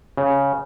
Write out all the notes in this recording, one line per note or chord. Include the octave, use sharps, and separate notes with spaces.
C#3